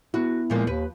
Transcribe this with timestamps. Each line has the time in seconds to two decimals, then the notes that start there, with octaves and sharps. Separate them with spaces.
0.14 B3 E4 F#4
0.50 A#2 F3 G#3 A#3
0.67 D#2 B4